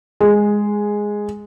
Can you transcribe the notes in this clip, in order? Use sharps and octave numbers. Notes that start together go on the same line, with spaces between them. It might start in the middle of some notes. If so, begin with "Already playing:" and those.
G#3